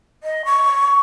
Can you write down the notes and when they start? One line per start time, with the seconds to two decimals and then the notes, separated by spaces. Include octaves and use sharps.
0.23 D#5
0.45 C#6